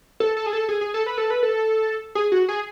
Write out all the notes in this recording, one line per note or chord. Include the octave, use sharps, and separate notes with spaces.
A4
A4
G#4
A4
G#4
G#4
A4
B4
A4
B4
A4
G#4
F#4
G#4